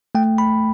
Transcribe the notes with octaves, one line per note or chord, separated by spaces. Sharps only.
A3 G5
B5